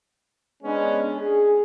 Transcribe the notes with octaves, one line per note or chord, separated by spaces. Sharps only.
G#3 B3 C#4 D4
G#4